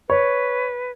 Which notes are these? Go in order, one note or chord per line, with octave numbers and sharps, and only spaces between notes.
B4 C#5